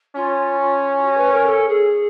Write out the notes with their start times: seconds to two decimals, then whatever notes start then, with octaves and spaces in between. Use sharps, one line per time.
0.15 C#4 F4
0.59 F4
0.97 F4
1.03 F#4
1.17 B4
1.32 A#4
1.46 A4
1.68 G#4